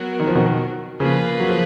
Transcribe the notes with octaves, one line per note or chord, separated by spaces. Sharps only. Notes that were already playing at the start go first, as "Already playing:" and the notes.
Already playing: F#3 B3 F#4 A#4
D#3
F3
B2 D#3
C#3 F3 A#3 F4 G#4 B4
F#3
F3